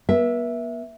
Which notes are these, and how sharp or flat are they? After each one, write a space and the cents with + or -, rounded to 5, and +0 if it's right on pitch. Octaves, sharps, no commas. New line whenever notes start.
B3 -45 E5 +0